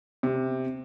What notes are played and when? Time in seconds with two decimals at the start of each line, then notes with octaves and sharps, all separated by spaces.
0.23 C3